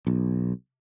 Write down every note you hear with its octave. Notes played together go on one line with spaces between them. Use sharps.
B1